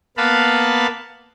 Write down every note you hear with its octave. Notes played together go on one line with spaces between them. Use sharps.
A#3 B3 B4 F5 A5 B5